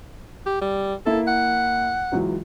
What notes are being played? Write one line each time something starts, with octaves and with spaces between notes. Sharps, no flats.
G4
G3
A#3 E4 A4 E5
F#5
C#2 E3 F#3